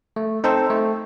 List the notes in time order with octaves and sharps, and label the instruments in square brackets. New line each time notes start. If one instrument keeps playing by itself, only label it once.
[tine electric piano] A3
C4 D#4 A4 C5
A3